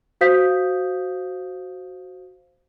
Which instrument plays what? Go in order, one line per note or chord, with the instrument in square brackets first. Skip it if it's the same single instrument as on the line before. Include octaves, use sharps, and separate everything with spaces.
[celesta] F#4 C5 F5 D#6 G6 B6